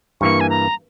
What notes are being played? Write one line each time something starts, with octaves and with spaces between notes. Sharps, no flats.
G2 E3 A#3 C#6
G#5
A#5